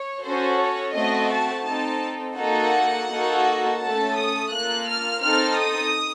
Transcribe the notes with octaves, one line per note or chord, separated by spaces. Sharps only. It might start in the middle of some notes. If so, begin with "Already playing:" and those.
Already playing: C#5
C#4 F#4 A4 C5
C#5
A3 C4 F#4 D#5
A5
C4 D#4 A4 A5
A#3 D#4 F#4 A4 F#5
A#3 D#4 F#4 A4
A3 C#4 A4 A5
D#6
A#3 F4 A4 F#6
F6
C4 D#4 A4 F6
D#6